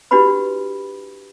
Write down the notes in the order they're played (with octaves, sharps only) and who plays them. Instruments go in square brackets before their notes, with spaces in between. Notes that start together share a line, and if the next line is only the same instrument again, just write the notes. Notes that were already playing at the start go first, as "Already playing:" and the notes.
[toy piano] D4 E4 F#4 G4 B4 B5